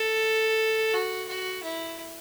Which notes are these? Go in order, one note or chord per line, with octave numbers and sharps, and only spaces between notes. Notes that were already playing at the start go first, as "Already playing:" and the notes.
Already playing: A4
F#4
F#4
E4